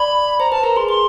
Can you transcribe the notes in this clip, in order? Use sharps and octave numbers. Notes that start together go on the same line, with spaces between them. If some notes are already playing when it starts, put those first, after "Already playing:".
Already playing: D5 B5
C5 A#5
B4 A5
A#4 A#5
G#4 C6
G#4 C6